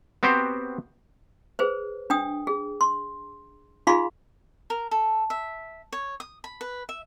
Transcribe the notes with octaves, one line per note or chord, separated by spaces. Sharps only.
B3 C4 F#4 G4 C5
G#4 B4 C5
D4 G5 D#6
G#4
C6
D#4 F4 G#4 F5 B5 C6
A#4
A4
E5
C#5
D#6
B5
B4
E5